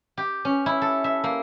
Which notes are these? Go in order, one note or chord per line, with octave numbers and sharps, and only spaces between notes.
G4
C#4
E4
A4
E5
A#3